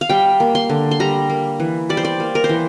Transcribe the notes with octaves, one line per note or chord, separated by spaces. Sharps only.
F5
G3 G5
A#3
C6
D3
C6
G3 A#5
A#3
E3
G3 D5
C5
D5
A#3
A#4
C5
E3